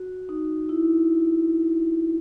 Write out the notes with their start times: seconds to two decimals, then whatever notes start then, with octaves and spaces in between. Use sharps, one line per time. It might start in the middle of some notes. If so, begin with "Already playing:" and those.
Already playing: F#4
0.29 D#4
0.69 E4